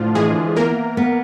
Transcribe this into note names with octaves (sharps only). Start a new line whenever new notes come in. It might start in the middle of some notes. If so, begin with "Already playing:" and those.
Already playing: A2 D3 F3 D4 F4
E3 G#3 G#4
A#3 B3 A#4
B3